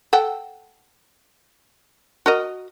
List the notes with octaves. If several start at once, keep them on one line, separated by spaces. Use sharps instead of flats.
A4 F#5 G5
F#4 A#4 D#5